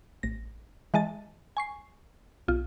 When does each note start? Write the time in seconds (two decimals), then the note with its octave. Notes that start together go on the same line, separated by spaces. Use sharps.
0.23 A1 A#6
0.94 E3 G#3 D#5 A5 A6
1.57 G#5 C#6 C7
2.48 B1 F4